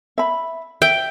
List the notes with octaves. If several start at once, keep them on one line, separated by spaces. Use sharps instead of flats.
E5 B5
E5 G5